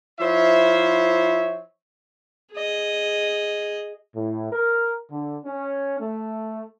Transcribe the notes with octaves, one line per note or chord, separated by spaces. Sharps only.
F3 E4 C5 C#5 E5
G#4 D#5
A2
A#4
D3
C#4
A3